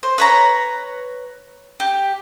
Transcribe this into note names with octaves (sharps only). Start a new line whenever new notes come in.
C5
B4 C#5 A#5
G4